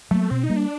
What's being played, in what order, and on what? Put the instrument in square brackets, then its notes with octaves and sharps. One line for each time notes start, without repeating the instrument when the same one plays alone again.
[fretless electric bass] F#3 A#3 [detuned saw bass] A3
[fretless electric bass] B2 [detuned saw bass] C4
[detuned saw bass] D#4
[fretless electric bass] G3 A#3
[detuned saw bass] D4